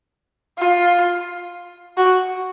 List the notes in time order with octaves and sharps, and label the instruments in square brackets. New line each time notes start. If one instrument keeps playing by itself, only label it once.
[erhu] F4
F#4